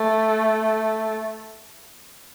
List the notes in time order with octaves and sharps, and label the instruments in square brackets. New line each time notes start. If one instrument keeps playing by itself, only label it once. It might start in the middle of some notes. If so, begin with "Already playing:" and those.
Already playing: [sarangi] A3